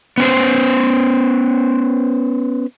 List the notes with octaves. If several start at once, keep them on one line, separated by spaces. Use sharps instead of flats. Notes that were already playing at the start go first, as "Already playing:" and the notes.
B3 C#4 C5